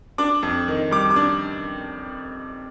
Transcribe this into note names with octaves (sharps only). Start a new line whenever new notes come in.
D4 D6
F2
D#3
G3 D6
D6
D4